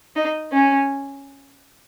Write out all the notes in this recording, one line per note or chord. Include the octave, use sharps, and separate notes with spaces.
D#4
C#4